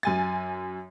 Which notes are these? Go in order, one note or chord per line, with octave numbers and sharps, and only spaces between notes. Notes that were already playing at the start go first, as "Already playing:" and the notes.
F#2 G#5 A6